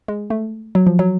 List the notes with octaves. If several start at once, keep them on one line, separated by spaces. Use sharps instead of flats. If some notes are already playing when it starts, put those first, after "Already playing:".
G#3
A3
F#3
F3
F#3